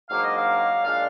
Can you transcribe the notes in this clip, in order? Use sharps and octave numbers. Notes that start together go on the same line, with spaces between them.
G#2 F#3 A#3 D4 F5
D#5
F5
A#2 G#3 D4 F5